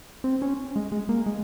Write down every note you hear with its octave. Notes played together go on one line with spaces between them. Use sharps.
C4
C#4
G#3
G#3
A#3
G#3